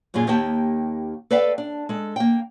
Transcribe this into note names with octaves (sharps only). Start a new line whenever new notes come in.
F#2 A#2 A#3 F4 G#4
D#2 D#3 A#3 G4 G5 A5
A4 B4 D5 E5 F5 G5
D4
G#3 A4
A#3 G5